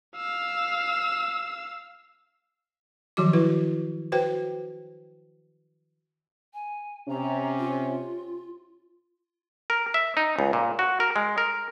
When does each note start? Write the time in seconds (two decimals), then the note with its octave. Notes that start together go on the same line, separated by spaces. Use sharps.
0.16 F5 E6
3.17 D#3 F3 F#3 F#4 D6
3.33 E4 F#4 B4
4.12 F#4 B4 C5 G5
6.54 G#5
7.09 C3 C#4 A#5
7.59 F4
9.70 A#4
9.94 E5
10.17 D#4
10.39 C#2
10.53 A#2
10.79 F#4
11.00 A#4
11.16 G#3
11.38 A#4